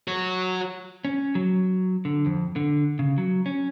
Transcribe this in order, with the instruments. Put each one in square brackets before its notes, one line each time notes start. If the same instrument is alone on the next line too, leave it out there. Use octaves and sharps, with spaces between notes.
[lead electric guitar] F#4 C#5
[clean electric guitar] C#4
F#3
D3
F2
D3
C#3
F#3
C#4